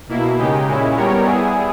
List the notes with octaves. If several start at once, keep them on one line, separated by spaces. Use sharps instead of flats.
B2 A#3 E4
C#3 G#3 D#4 G4
A#2 G#3 C#4 E4
G3 B3 G4 A#4 C#5
G3 B3 E4 G#4